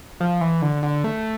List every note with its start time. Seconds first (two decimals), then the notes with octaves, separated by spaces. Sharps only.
0.20 F3
0.41 E3
0.62 D3
0.83 D3
1.04 A3